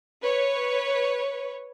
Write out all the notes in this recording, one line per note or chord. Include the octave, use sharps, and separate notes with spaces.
B4 C#5